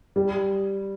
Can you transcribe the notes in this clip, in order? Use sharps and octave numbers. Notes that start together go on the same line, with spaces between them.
G3